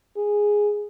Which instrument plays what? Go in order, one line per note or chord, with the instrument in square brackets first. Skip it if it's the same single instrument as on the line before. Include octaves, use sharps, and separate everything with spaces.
[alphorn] G#4